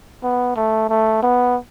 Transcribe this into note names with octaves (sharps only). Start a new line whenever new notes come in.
B3
A3
A3
B3